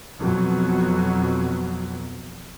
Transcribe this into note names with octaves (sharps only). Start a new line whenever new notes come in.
F2 B2 F#3